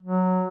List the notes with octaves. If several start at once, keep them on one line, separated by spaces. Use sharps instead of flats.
F#3